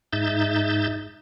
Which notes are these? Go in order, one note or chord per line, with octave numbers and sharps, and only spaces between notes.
G#2 D#4 E5 G6 A6